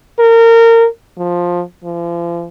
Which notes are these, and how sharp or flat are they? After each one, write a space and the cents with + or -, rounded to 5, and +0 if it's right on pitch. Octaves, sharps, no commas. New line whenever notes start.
A#4 -25
F3 +10
F3 -40